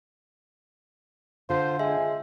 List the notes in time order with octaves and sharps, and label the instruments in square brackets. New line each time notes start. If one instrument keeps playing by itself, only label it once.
[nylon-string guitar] D3 [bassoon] F4 [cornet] C5
[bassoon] G#3 [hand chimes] E5 [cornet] G#5